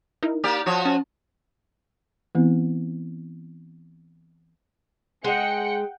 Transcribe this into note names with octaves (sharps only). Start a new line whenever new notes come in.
D#4 E4 A#4
A#3 G4 D5 F6
F3 F#4 C#5
C#4 A5
E3 B3 C4 E4
G#3 D#5 F#5 G5 C#7